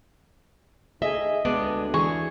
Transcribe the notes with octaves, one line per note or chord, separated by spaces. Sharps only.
A3 D#4 G#4 D#5 E5
D2 G#3 B3 D4
E3 G#4 C#6